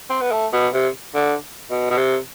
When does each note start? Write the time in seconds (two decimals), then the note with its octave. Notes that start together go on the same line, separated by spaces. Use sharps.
0.10 C4
0.21 B3
0.32 A3
0.53 B2
0.73 C3
1.15 D3
1.71 B2
1.90 B2
1.97 C3